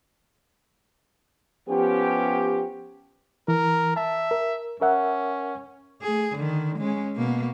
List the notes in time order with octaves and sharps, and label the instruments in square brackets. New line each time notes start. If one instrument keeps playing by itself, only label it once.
[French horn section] F3 B3 C#4 G4
[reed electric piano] E3 [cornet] A#4
[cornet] E5 [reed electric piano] A5
[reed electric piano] A#4
[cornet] C#4 [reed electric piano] A#4 E5 F#5
[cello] A3 G#4
D3 D#3
G#3 C#4
B2 A#3